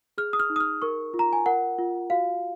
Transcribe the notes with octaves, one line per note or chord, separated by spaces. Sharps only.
G#4 F6
D#6
F6
D#4
D#6
F6
A#4 C#6
F4
A#5
G#5
A#4 F#5
F4
F#4 F5